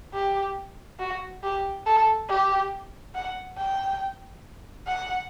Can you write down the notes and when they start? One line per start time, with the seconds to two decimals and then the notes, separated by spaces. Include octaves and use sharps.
0.14 G4
0.99 F#4
1.43 G4
1.86 A4
2.29 G4
3.15 F#5
3.58 G5
4.87 F#5